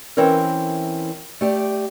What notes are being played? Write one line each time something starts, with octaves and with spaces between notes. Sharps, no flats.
E3 C4 C#4 E4 A#4
A3 G4 D5